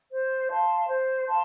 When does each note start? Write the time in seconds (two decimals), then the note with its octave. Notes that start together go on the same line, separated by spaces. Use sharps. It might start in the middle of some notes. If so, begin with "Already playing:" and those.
0.11 C5
0.49 F5 A5 C6
0.87 C5
1.26 F5 A5 C6